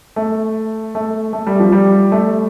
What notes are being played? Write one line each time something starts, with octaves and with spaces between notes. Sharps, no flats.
A3
A3
A3
G3
F3
G3
A3